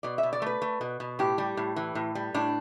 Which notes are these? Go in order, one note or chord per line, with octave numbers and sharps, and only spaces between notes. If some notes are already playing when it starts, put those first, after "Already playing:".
B2 D5
E5
B2
D5
A3 B4
A3
B2
B2
A2 G4
G3
A2
E3
A2
G3
A2 D4